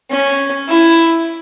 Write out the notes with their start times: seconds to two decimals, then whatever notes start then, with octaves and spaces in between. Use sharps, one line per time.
0.11 C#4
0.69 E4